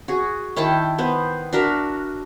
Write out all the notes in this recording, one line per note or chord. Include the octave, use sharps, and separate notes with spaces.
F#4 G#4
D#3 E4 G5 A5
B3 C5
D4 F#4 A#4 E5